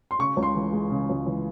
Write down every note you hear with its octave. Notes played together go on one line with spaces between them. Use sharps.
C6
C#3 C#6
C#2
C6
E3
G#3
C#3
C#2
E3